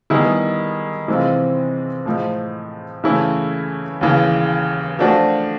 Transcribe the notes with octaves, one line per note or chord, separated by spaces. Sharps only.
D#3 G3 B3 E4 G#4
C3 E3 G#3 C4 F4
A2 F3 G#3
C#3 E3 A3 C#4 E4
D#2 C#3 E3
F3 A3 D4 F#4